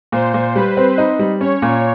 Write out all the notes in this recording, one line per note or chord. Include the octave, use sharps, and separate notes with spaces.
A#2 C5
A#2
G3 B4
C4
D#4
G3
C#4 C#5
A#2